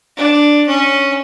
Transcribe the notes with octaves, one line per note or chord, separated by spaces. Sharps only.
D4
C#4